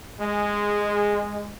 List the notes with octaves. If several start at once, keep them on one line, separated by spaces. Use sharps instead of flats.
G#3